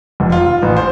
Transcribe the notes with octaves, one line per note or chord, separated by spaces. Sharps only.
F1
F4
A1
C5